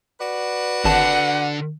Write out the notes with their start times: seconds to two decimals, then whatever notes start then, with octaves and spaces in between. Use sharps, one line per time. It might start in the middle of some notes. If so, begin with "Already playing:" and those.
0.19 F#4 B4 D5
0.85 G#1 D3 F#5 A5